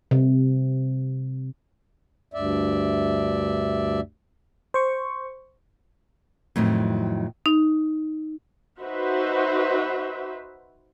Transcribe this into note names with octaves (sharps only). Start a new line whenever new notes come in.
C3
D2 G2 D5 E5
C5 C#6
F2 A2 D#3 F#3
D#4
D#4 F#4 B4 C5 E5